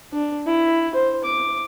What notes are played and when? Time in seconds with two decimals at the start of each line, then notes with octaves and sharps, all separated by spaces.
0.13 D4
0.47 E4
0.95 C5
1.24 D6